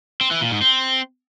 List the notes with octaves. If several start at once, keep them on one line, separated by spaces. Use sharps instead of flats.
C4
E3
A#2
G#2
C4